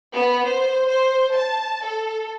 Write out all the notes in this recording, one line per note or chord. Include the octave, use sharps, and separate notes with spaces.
B3
C5
C5
A5
A4